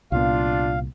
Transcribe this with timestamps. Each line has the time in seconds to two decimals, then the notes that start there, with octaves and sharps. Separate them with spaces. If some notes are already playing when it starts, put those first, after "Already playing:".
0.12 C2 A#2 B3 D4 F4 F5